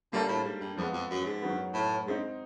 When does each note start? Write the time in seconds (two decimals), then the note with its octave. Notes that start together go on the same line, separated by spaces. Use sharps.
0.13 D3 G3 A#3 D4 F4 A4
0.28 A2
0.45 G#2
0.61 G2
0.77 F2 F3 G#3 B3
0.93 F2
1.10 F#2
1.25 G#2
1.42 F#2 D#3 F#3 B3
1.74 A2
2.06 G#2 G#3 C4 D#4